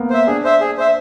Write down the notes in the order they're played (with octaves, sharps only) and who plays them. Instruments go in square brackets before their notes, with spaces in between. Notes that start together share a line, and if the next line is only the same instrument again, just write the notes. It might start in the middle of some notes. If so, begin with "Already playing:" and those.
Already playing: [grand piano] A#3 B3
[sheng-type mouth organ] C5 E5
[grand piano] D4 [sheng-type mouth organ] G#4
[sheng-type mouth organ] C5 E5
G#4
C5 E5